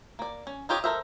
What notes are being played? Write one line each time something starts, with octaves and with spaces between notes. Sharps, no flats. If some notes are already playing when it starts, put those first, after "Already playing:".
A#3 D5
C#4
D#4 F4 G4 C#5 D#5
A4 A#4 C5 D#5 E5